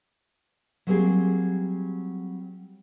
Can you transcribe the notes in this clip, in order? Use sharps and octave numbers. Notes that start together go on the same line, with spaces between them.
F#3 G3 A#3 C4 G4 G#4